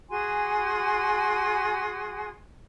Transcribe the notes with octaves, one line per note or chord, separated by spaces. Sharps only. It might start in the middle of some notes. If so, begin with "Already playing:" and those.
F#4 G#4 G#5 C6